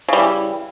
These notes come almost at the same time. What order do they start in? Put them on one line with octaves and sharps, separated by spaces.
C#3 G3 E3